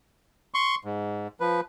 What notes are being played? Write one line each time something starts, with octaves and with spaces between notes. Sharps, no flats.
C6 C#6
G#2
F3 B4